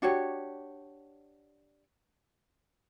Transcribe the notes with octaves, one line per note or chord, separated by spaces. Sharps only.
D4 F#4 G4 C#5